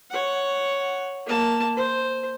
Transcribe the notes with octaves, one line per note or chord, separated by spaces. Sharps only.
C#5 F#5
A#3 A5
C5